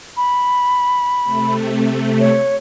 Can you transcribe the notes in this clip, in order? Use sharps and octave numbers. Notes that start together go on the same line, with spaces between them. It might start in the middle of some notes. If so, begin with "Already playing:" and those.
B5
C3 A3
C#5